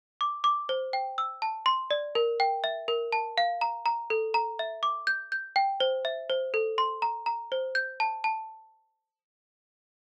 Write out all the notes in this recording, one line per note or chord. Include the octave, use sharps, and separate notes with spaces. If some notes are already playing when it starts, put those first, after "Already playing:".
D6
D6
C5
G5
E6
A5
C6
D5
A#4
G5
E5
A#4
A5
F5
A#5
A#5
A4
A#5
E5
D6
G6
G6
G5
C5
E5
C5
A4
C6
A#5
A#5
C5
G6
A5
A5